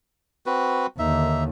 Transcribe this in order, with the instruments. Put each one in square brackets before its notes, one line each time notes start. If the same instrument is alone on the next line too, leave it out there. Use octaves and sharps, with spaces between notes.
[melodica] C4 F#4 B4
[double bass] D#2 D3 [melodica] D#4 E5